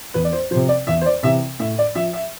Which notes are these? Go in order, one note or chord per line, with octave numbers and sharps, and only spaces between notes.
E2 B4
D5
C5
C3 F3 C5
D5
E2 E5
C5
D5
C3 E3 E5
A2 E5
D5
F3 E5
E5